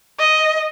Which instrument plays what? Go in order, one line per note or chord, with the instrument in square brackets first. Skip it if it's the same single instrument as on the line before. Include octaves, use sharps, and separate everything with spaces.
[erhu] D#5